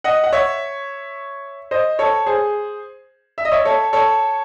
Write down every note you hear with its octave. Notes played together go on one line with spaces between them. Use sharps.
D#5 F#5
F#5
C#5 E5
C5 D#5
A4 C#5
G#4 C5
E5
D#5
C#5 E5
A4 C#5
A4 C#5